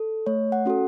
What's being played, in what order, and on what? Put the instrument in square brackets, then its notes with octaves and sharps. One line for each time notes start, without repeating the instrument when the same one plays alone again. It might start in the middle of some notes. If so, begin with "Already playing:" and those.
Already playing: [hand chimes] A4
A3 C#5
F#5
C#4 F#4 A4